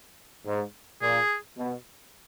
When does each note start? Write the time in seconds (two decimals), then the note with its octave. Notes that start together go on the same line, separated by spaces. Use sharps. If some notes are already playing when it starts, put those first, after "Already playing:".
0.46 G#2
1.02 A#2 G#4
1.58 B2